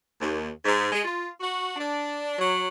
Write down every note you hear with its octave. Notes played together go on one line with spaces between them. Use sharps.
D#2
G#2
G#3
F4
F#4
D4
F#3